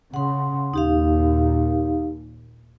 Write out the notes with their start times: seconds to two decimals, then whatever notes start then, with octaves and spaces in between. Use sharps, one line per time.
0.14 C#3 F#5 C6
0.74 D#2 A#2 D#4 G4 F5